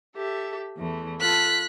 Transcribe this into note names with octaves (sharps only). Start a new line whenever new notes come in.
G4 A4 E5
E2 E3 A3
F4 A4 A5 F#6 B6